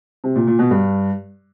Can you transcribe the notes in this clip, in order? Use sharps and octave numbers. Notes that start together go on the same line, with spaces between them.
C3
A#2
A#2
B2
G2